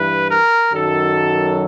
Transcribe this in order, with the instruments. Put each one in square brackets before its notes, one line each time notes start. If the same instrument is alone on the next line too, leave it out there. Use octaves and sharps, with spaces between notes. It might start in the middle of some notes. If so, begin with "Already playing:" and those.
Already playing: [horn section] G2 E3 B4
A#4
F#2 D#3 F#3 A4